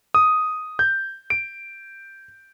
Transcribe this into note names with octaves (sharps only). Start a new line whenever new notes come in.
D#6
G6
D7